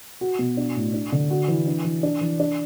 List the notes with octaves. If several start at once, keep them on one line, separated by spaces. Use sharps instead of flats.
F#4
B2
D4
A2
D4
D3
F#4
E3
D4
E3
D4
E3
D4